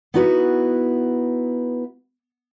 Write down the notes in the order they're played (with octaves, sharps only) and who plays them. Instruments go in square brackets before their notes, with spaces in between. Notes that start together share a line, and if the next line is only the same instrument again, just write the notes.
[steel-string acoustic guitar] B3 D#4 E4 F#4 B4